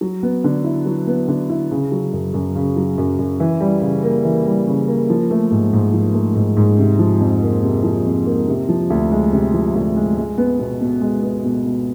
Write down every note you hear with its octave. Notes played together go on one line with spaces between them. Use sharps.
F#3
B3
D3
E4
F#3
B3
D3
E4
C#3
F#3
F#2
F#2
C#3
F#3
F#2
F#2
E3
G3
C#3
A#3
E3
G3
C#3
A#3
F3
A3
G#2
G#2
F3
A3
G#2
G#2
C3
F3
F2
A#3
C3
F3
F2
A#3
C3
F3
D2
G#3
C3
F3
D2
G#3
G#3
B3
B2
B2
G#3
B3
B2
B2